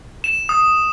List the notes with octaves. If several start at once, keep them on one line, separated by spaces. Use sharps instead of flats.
E7
D#6